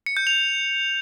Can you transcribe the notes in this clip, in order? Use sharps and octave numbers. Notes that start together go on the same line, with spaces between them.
C#7
G6
F7